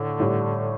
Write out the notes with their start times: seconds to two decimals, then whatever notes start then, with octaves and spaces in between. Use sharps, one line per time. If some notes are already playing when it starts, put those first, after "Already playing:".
Already playing: A2 D3
0.20 A2 G3 D4